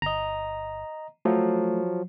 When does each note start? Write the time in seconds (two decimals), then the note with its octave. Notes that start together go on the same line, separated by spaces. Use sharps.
0.02 G1 D#5 A#5
1.25 F3 F#3 A3